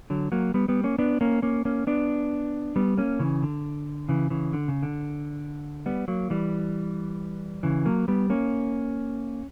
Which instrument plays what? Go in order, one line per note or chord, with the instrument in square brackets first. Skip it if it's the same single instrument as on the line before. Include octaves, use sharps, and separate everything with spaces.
[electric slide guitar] D3 F#3
F#3 A#3
G3 B3
G3 B3
A#3 C#4
B3 D4
A#3 C#4
A#3 C#4
A#3 C#4
B3 D4
G3 B3
A#3 C#4
C#3 E3
D3
C#3 E3
C#3 E3
D3
C#3
D3
G3 B3
F#3 A#3
E3 G3
C#3 E3
F#3 A#3
G3 B3
A#3 C#4